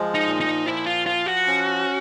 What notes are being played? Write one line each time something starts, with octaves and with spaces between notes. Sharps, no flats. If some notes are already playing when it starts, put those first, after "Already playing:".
Already playing: F3 G#3
D#4
A#2
D#4
F3 E4
F4
F3 F4
F#4
C#4